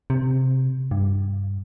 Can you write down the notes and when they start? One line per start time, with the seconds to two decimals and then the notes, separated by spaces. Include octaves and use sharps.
0.10 C3
0.91 G2